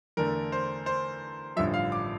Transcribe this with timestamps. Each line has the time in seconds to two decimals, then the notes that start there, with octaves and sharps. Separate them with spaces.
0.17 E2 D3 A3 A#4
0.52 C5
0.86 C5
1.56 A1 G2 D3 F3 E5
1.74 F5
1.92 D6